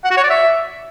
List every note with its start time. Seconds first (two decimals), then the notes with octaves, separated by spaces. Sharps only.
0.04 F#5
0.10 F#4
0.17 C#5
0.23 D5
0.30 E5